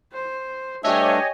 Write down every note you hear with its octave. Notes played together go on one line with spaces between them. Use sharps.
C5
G2 A3 D4 G4 C#5 D#5 E5 G#5